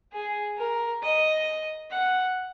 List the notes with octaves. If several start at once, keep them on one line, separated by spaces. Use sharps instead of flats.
G#4
A#4
D#5
F#5